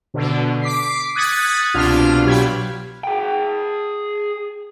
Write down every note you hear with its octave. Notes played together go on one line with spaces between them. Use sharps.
B2 D3
D6 B6 C7
D#6 F#6 G#6 A6 B6 C#7
C2 B2 D4 F4 F6
B2 F#3 G4 B5 G#6
G#4 G5